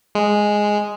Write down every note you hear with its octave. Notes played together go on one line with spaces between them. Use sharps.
G#3